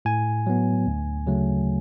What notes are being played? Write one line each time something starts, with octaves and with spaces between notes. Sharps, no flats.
A2 G#5
F#3 B3
D2
C#3 F#3 A3